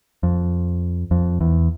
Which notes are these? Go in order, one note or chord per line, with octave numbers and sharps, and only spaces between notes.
F2
F2
E2